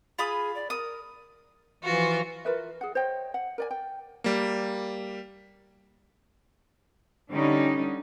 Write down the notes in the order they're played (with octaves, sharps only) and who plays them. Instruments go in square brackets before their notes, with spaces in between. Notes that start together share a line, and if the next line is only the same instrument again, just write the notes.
[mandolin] F4 B5 D#6 [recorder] G#4
[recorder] D5
[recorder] A#4 [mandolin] D#6
[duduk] E3 [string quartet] F3 F4 F#4
[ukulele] F4 A#4 B4 E5
G#4 F#5
C5 C#5 D#5 G5
F#5
A#4 D5 G#5
G5
[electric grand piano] G3 A#3
[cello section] D3 G3 C#4 D#4